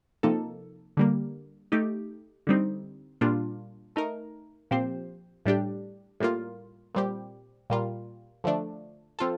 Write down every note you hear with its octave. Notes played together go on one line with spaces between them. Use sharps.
C3 F3 A#3 D#4 A4
D3 G3 A#3
A3 D#4 G4
D3 G3 C4 D#4
A#2 G3 A#3 D4 F4
A3 D#4 A#4
A#2 F3 C4 G4 C5
A2 G3 D4 G4
A2 G3 A#3 F4
A#2 G3 C4 G4
A#2 G3 A#3 F4
D3 F3 A3 D4
F3 C4 F4 A4